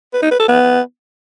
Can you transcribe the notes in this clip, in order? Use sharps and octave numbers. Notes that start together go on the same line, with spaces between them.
B4
D#4
B4
A4
B3